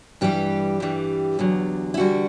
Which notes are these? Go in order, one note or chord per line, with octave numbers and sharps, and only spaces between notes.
G2 E3 G3 G4
G2 E3 G3
E2 D3 F#3
E4
E2 D3 G3 F#4